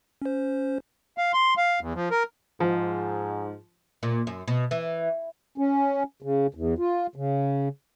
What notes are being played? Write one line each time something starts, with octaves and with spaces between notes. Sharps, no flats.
C#4 C5
F5
C6
F5
E2
F3
A#4
G#2 F3
A#2
F#2
B2
E3
C#4
C#3
E2
F4
C#3